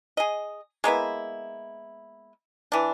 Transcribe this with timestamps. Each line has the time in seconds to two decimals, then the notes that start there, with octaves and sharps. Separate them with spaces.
0.17 G#4 D#5
0.84 G#3 A#3 B3 E4
2.72 E3 D4